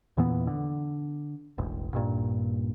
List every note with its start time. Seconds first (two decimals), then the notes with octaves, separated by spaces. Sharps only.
0.17 E2 A#2 E3 B3
0.47 D3
1.58 E1 A1
1.93 A#1 G2 A#2